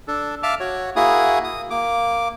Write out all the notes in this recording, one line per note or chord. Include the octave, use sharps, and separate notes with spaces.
D4 A4
E5 F5 A5 D6 F6
F#4 C#5
A#3 E4 F#4 G#4 D#6
D#6
A#3 D6